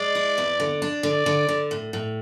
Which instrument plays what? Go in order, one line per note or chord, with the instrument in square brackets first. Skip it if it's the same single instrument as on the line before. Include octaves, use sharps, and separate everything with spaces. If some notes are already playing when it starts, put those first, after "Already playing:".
Already playing: [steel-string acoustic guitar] G#3 [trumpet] D5
[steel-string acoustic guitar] E4
E2
D3
D4
[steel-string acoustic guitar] D3 [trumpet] D5
[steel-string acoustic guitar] D3
D3
A2
A2